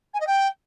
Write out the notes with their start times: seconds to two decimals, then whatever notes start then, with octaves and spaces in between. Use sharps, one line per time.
0.14 G#5
0.20 D#5
0.27 G5